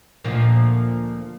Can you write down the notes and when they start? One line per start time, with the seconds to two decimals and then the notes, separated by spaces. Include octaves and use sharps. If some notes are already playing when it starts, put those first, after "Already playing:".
0.24 D2 A#2 F3